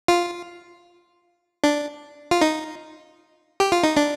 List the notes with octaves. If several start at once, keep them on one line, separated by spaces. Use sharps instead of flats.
F4
D4
F4
D#4
G4
F4
D#4
D4